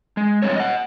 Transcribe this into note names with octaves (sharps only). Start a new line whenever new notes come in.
G#3
G#2 F3 G3 A3 C4 C#5
D#5 F#5